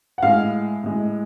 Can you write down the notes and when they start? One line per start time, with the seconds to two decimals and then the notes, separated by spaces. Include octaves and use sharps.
0.18 F#5
0.22 A2 G#3 F5
0.83 A2 G#3